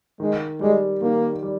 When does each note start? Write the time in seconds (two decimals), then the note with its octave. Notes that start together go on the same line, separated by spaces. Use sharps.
0.20 D#3 G#3
0.60 G3 G#3
1.02 D#3 A#3
1.43 G3